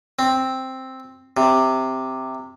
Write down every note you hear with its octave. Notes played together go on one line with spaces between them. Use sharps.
C4
C3